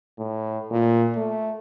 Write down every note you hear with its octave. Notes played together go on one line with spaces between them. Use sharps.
A2
A#2
A3